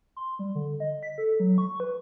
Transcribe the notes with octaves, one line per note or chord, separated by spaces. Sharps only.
C6
G3
D3
D#5
B6
A4
F#3
C#6
B4